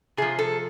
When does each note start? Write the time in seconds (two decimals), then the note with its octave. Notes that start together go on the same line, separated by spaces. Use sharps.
0.17 C3 F3 G#4
0.39 A4